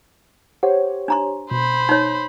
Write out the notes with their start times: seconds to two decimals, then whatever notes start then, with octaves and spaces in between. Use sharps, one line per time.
0.63 G4 C5 C#5 F#5
1.08 D4 A#5 C6
1.51 B2 C5 B5
1.89 D#4 C#5